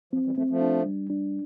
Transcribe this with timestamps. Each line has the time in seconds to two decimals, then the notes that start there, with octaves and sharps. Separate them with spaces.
0.13 F3 C4
0.25 E3 G3
0.38 F3 A3 C4
0.50 F3 A3
0.61 D4
0.86 G3
1.10 D4